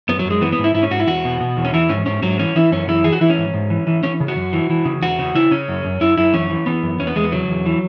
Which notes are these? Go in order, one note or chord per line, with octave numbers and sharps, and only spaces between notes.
F#2 B3
F#3
F#2
G#3
E3 B3
B3
G#2
E4
G#2 E4
C#4
G#2 F#4
E4
E2 F#4
B2
B2
E2
C#4
E3 E4
G#2 C#4
G#2 C#4
G#2 F#3
E3 C#4
E3 E4
F#2 C#4
E3 E4
E3 G#4
F#4
E3 E4
C#4
G#2
G#2
E3
E3
E3 C#4
C#3
F#4
F#2
E3
E3
C#3
E2 F#4
C#3
C#3 E4
C#3 C#4
F#2
F#2
F#2 E4
F#2 E4
E3 C#4
E3
E3 B3
F#2
E2 C#4
B3
E2 G#3
B3
C#3 F#3
E2
E3